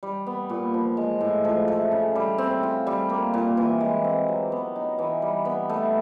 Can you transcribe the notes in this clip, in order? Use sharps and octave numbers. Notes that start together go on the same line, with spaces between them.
G3
B3
A#2
F3
G#3
A2
F3
A3
C#3
G3
C4
F4
G3
A#3
A#2
E3
G#3
C4
F#3
B3
D#4
E3
G3
B3
A3